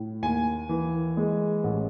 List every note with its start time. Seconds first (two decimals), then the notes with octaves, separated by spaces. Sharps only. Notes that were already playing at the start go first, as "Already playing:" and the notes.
Already playing: A2
0.22 D#2 G#5
0.69 E3
1.17 G#3
1.64 A1